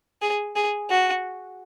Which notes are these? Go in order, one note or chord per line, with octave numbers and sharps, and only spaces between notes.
G#4
G#4
F#4